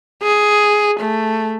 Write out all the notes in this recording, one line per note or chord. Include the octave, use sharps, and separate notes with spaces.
G#4
A3